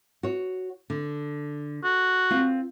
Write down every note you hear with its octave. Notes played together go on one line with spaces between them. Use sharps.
F#4 C#5
D3
F#4
C4 F4